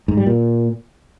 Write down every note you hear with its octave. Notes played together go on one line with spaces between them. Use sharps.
G#2
G3
A#2